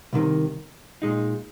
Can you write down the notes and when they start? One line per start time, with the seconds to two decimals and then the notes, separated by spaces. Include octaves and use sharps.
0.13 C2 C3 D#3
1.02 A#2 G#3 D#4